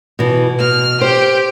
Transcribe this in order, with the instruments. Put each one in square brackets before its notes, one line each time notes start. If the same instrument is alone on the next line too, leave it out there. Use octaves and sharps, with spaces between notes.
[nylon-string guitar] B2 E3
[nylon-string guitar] B2 [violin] F6
[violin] G4 [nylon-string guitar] C5